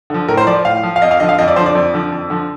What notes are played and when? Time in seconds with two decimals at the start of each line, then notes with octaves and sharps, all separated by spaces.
0.10 D3 F3
0.28 A2 A#4
0.37 C5
0.47 F3 D5
0.65 A2 F5
0.83 F3
0.96 F5
1.02 F2 D#5
1.11 F5
1.20 D3 F3 D#5
1.29 F5
1.38 F2 D#5
1.48 D5
1.56 D3 F3 C5
1.66 D5
1.75 F2
1.94 D3 F3
2.12 F2
2.30 D3 F3